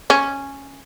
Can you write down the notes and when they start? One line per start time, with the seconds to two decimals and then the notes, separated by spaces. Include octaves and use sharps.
0.10 C#4